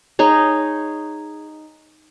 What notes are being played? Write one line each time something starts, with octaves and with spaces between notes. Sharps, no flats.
D#4 G#4 C#5